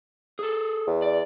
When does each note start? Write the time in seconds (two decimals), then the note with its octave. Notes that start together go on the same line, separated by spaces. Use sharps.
0.39 G#4 A4
0.87 E2
1.02 D5